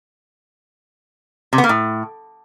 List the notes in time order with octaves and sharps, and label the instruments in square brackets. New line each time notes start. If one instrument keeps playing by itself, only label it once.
[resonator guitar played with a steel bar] C3
B3
A#3
A2